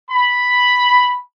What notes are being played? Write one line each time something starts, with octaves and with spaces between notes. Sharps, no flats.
B5